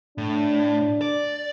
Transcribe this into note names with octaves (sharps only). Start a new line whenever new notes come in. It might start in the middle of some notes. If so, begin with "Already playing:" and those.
A2 D4
D5